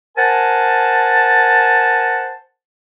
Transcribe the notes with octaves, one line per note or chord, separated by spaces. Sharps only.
A#4 C5 F#5 G#5 A5